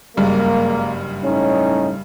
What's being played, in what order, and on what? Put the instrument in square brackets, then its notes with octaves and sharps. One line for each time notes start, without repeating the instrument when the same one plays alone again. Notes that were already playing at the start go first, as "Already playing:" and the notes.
[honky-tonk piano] F#1 G2 [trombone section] G#3 A#3
[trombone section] A2 C#4 D#4